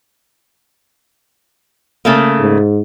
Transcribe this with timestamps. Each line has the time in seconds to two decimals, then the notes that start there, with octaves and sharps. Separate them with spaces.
2.05 C#3 A3 A#3
2.40 G#2